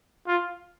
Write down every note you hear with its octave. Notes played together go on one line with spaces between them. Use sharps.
F4